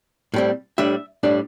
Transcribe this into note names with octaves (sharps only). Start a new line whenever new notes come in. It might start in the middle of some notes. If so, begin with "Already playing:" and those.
A2 G3 C4
A2 G3 D4 E5
A2 G3 D4